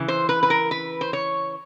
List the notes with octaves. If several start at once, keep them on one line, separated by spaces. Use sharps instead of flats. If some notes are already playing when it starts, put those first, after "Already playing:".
Already playing: C#3 E3
C5
B4
B4
A#4
B4
C5
C#5